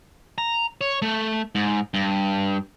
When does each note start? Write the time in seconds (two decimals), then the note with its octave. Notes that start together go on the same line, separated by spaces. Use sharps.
0.38 A#5
0.81 C#5
1.02 A3
1.55 G#2
1.94 G2